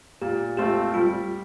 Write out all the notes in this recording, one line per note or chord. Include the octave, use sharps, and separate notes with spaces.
A#2 G4
A3 C4 F4 G4
G3 F4